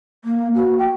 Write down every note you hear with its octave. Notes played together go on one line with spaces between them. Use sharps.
A#3
F#4
G5